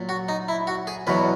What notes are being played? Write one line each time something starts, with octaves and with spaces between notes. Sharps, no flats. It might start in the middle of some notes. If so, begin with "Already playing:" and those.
Already playing: A#2 F#3
F#4
D#4
E4
F#4
G#4
E2 B2 F#3 B4